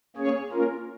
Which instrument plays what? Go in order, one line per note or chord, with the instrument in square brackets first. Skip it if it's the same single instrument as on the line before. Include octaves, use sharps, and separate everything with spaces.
[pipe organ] A#3 C#4 G#4 C#5
A#3 C#4 F4 A#4